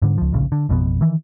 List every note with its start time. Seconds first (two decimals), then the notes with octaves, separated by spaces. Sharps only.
0.02 G#2 D3
0.18 C#2 F3
0.33 D1 A#1 C#3
0.52 D3
0.69 A1 F2 B2 B3
1.01 D#3 E3